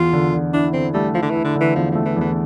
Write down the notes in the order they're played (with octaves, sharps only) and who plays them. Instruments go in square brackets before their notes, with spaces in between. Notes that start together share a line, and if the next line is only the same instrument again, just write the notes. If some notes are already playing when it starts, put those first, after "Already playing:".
Already playing: [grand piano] E2 [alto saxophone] F4
[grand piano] D3
D3
[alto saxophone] D4 [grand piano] E4
[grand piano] D3 [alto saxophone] C4
[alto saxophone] G3 [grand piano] A3
[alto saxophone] F3 [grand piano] E4
[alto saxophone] D3
[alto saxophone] E3 [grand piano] E4
[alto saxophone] D3
[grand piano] D3 [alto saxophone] E3
[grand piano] E2 [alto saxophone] F3
[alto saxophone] F3 [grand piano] A3
[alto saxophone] E3
[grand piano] E2 [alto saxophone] E3